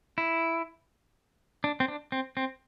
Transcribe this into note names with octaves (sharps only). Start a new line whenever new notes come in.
E4
D4
C4
D4
C4
C4